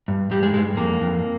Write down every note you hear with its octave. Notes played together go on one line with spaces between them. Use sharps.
G2
G2 G3
G#3
G2 G#3
F2 A#3
F2